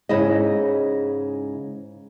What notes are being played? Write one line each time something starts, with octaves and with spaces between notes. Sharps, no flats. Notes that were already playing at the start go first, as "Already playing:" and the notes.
G#2 C#3 E4 G#4 D#5